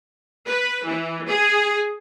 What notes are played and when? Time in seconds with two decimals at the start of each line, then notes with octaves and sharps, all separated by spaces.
0.48 B4
0.85 E3
1.27 G#4